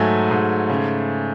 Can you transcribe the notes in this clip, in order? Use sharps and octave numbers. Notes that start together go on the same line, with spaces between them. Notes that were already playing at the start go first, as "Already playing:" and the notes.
Already playing: G#2 F#3 A3 G#5
G#2
C#3